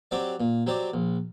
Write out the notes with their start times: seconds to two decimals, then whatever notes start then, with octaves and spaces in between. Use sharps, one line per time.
0.11 F#3 C4 G4 D5
0.40 A#2
0.67 F#3 C4 G4 D5
0.94 A#1